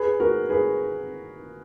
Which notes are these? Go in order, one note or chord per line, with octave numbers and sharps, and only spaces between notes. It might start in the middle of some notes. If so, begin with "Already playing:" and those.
Already playing: G#4 B4
F#4 A#4
G#4 B4